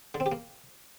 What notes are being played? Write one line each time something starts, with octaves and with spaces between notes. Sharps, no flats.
D3
C4
G4
A#3